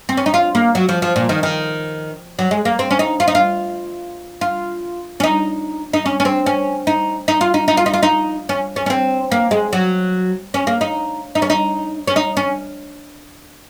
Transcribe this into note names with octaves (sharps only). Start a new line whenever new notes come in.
C4
C#4
D#4
F4
A#3
F#3
F3
F3
A#2
D#3
D#3
F#3
G#3
A#3
C4
C#4
D#4
F4
D#4
F4
F4
C#4
D#4
D#4
C#4
C#4
C4
C#4
D#4
D#4
F4
D#4
D#4
F4
D#4
F4
D#4
C#4
C#4
C#4
C4
A#3
G#3
F#3
C#4
A#3
D#4
D#4
C#4
D#4
C#4
D#4
C#4